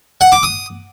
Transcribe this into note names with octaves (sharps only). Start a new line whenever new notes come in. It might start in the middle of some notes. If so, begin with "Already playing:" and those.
F#5
D6
D#6